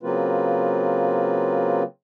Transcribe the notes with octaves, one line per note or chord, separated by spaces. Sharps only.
C#3 F#3 A#3 C4 F4 B4